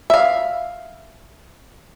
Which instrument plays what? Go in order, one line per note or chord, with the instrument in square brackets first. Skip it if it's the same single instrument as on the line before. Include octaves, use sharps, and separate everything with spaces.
[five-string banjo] E5 F5